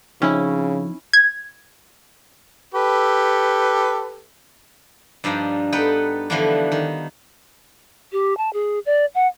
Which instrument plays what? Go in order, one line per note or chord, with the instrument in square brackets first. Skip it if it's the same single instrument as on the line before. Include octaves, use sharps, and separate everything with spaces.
[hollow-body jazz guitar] F2 [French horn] C#3 [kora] C#4 E4 [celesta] D#4
[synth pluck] G#6
[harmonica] G4 A4 B4
[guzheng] G2 F3 D4 D#4 G5
B3 D#4 A4 B4 G5
D3 E3 F3 G3 B3 D4
D#3
[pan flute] G4
A5
G#4
D5
F#5